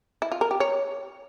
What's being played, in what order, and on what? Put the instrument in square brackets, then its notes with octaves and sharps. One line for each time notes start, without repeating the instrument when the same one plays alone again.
[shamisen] E4
F4
A#4
G4
C#5